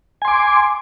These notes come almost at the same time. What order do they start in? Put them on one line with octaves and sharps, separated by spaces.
G#5 C6 D6